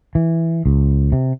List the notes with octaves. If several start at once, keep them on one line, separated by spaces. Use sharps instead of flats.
E3
C#2
C3